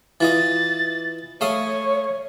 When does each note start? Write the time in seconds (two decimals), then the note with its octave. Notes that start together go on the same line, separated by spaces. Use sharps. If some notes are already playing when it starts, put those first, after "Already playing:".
0.21 E3 F4 D#5 A6
1.41 A3 C#5 F5 C#6 D#6